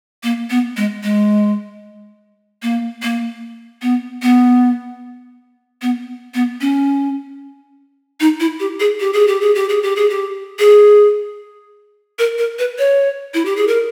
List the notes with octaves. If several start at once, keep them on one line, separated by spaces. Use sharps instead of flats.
A#3
B3
G#3
G#3
A#3
A#3
B3
B3
B3
B3
C#4
D#4
E4
G4
G#4
G4
G#4
G4
G#4
G4
G#4
G4
G#4
G4
G#4
A#4
A#4
B4
C#5
E4
G4
G#4
A#4